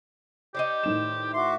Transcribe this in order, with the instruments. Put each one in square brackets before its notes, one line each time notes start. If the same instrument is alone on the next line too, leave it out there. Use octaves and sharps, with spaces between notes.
[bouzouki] D#4 C5 D5 [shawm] G4
[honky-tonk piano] A2 D#3 E7
[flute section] F#4 E5 D6 [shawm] C6